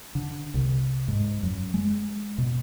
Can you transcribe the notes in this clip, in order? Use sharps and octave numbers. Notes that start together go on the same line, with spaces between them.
D3
C2
G#2
F#2
G#3
B2